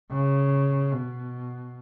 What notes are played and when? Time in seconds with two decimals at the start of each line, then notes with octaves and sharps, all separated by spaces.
0.12 C#3
0.93 B2